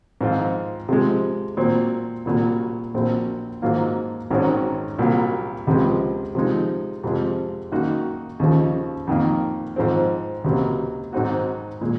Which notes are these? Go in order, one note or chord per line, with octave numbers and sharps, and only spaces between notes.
G#2 F3 C4 F4
C3 F3 G#3
A#2 F#3 C4
C2 A#2 F#3
A#1 A#2 F#3 C4
G#2 F#3 A#3 F4
G#1 G#2 D#3 F#3 C#4
C2 A#2 F#3 A#3
C#2 C3 F3 G#3
C3 F3 G#3 D#4
F2 C3 F3 G#3
F#2 D#3 A#3 D#4 F#4
D#2 C#3 F3
F2 D#3 A#3
G#2 F3 C4
C#2 C3 F#3 A#3
G#2 F#3 C4 D#4 F#4
A#2 G#3